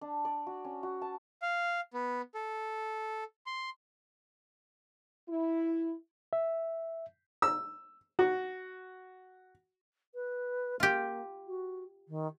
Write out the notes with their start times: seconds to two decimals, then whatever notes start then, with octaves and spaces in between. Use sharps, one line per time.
0.01 D4
0.25 D5
0.47 F#4
0.65 C#4
0.83 F#4
1.02 A5
1.42 F5
1.94 B3
2.35 A4
3.46 C6
5.29 E4
6.33 E5
7.42 E6
8.19 F#4
10.14 B4
10.80 A#3 F4 G4
11.47 F#4
12.08 D#3